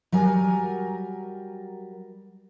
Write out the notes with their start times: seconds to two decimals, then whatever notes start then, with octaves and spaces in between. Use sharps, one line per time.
0.12 F#3 G3 A#4 G#5